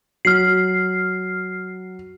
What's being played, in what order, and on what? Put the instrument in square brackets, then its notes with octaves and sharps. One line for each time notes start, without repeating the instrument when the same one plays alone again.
[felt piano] F#3 [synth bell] F6 C7